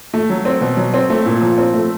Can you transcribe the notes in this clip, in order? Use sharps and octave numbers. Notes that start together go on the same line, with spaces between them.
A3
F#3
C4
B2
F#3
C4
A3
A#2
F3
C4
A3